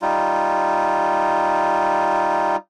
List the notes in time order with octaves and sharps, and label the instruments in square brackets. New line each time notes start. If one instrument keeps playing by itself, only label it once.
[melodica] G3 D#4 F4